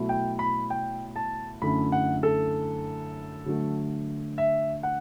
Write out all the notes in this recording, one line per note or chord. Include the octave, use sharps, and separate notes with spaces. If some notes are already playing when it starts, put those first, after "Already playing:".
Already playing: B2 F#3 A3 E4
G5
B5
G5
A5
F#2 D3 A3 E4 B5
F#5
A4
D3 F#3 A3
E5
F#5